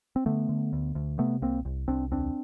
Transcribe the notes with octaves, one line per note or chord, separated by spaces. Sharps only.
C4
D3 A3 B3
D3
D2
D2
C3 A3 B3
C2 A#3 C4
C2
C2 C4 D4
D#2 C4 D4